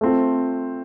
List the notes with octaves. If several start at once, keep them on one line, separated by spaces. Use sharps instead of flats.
A3 C4 F4